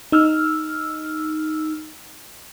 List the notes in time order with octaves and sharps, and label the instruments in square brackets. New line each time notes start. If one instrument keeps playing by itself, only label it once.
[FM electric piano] D#4 E6 F6